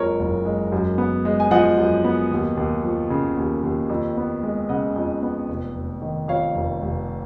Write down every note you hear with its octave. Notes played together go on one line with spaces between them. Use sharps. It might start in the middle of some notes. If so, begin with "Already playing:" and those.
Already playing: F#1 F2 F3 G#3 A#4 C#5
F#1
G#3
F#2
B3
G#3
G#5
F3 D#5 F#5
F#2
B3
D#2
D#2
F3
C#3
D#2
D#2
F2
B3
G#3
C#3 D#5 F#5
F2
B3
F1
F1
D#3
F2 C#5 F5
F1
F1